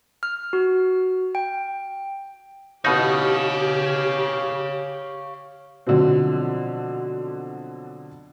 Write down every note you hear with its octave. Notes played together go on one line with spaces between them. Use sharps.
F6
F#4
G5
A1 B2 D#4 G4 C#5 F5
B2 D3 F3 F#3 C4